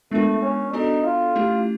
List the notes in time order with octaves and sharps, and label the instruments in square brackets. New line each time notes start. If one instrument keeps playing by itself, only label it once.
[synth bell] G#3 B3 D4 F4 A#4 [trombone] A3
[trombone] C#4
[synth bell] B3 D4 F#4 A4 D5 [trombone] D#4
[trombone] F4
[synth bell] A3 C#4 E4 G4